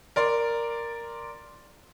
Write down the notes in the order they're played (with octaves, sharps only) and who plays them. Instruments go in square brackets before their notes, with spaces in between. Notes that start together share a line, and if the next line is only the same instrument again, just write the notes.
[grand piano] A#4 D5 C6